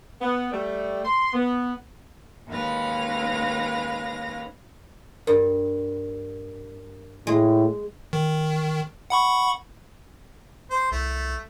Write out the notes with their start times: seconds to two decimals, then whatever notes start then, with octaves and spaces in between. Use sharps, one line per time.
0.21 B3
0.52 G3 A3
1.04 C6
1.33 B3
2.48 D#2 G#3 C#4 B4 F5 A#6
5.27 G2 A#4
7.27 A2 G#3
8.13 D#3
9.10 F#5 B5 C#6
10.70 C5
10.91 C2 A3